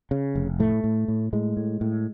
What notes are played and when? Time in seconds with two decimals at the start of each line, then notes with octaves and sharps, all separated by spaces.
0.11 C#3
0.35 F1
0.60 A2 A3
0.84 A2
1.08 A2
1.33 A2 G#3
1.57 A2
1.81 A2